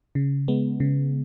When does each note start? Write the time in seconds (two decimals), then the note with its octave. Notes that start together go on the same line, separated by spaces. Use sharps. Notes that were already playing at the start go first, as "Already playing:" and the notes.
0.15 C#3
0.48 G#3 B3
0.80 C#3